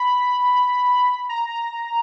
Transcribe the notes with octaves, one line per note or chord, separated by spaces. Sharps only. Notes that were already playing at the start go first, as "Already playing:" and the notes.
Already playing: B5
A#5